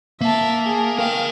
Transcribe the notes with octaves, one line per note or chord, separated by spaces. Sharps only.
A#3 E5 A5
G#4
A#4 F5 G5